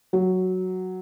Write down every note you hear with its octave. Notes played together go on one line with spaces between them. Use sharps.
F#3